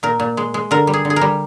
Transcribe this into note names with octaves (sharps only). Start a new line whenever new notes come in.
A#2 A#4
A#2
G#3
G#3
D3 A#4
G3
G#4
D3
G#4
A#4
G3